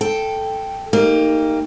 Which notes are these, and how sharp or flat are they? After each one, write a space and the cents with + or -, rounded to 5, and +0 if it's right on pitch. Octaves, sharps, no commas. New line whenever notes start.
A4 +0 G5 +0
A#3 -15 D#4 +0 G4 +25